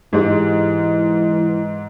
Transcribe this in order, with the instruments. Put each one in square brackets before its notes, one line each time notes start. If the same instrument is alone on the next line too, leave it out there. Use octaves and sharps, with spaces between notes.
[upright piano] G#2 [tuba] E3 [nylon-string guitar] G4 G#4 D#5